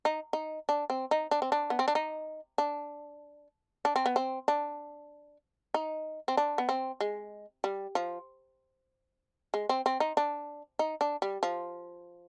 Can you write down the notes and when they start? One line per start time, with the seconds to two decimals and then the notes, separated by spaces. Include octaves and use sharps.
0.05 D#4
0.33 D#4
0.69 D4
0.90 C4
1.11 D#4
1.31 D4
1.42 C4
1.52 D4
1.70 B3
1.79 C4
1.88 D4
1.95 D#4
2.58 D4
3.85 D4
3.96 C4
4.06 B3
4.16 C4
4.48 D4
5.74 D#4
6.28 C4
6.37 D4
6.58 B3
6.69 C4
7.00 G#3
7.64 G3
7.95 F3
9.54 G#3
9.69 C4
9.86 C4
10.00 D#4
10.17 D4
10.79 D#4
11.01 D4
11.22 G3
11.43 F3